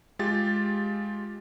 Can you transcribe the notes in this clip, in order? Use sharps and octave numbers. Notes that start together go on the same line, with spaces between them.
G#3 F4 G4 A6